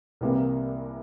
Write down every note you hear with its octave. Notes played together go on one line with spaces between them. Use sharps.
C2 C3 E3 G3 A#3